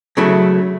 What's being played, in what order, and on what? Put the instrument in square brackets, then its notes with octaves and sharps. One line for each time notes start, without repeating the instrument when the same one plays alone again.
[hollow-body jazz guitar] C#3 F#3 A3 E4